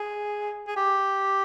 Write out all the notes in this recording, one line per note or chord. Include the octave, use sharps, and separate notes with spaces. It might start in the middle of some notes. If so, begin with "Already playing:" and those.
Already playing: G#4
G#4
G4